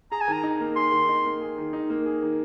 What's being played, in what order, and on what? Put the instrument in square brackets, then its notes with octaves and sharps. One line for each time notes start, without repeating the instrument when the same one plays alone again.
[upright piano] G#4 [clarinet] A#5
[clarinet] G#5
[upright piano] D#3
[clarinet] A#5
[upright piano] D#4
A#3
[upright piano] G#4 [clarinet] C6
[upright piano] D#3
D#4
A#3
G#4
D#3
D#4
A#3
G#4
D#3